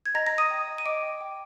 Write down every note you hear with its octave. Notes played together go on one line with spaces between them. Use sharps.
G#6
D#5 A#5 A#6
A#5 A#6
D#5
D#6 D#7
G5
D#5
D#7
D#5 D6 D7
G5
G5